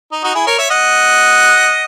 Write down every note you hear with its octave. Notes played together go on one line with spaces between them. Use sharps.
D#4
D#4 F#4
E4 G#4
A#4 C#5
C#5 E5
D#5 F#5